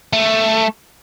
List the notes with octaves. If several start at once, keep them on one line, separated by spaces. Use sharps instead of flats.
A3